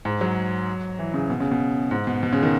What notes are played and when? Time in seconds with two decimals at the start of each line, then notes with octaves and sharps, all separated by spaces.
0.05 G#2
0.21 F#3
0.99 E3
1.14 C#3
1.30 B2
1.40 C#3
1.51 B2
1.91 G#2
2.07 B2
2.23 B2
2.33 C#3
2.43 D#3